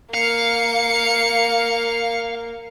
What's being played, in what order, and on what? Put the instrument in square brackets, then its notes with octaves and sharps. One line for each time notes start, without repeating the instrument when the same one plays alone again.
[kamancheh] A#3 [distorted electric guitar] F5 [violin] C#7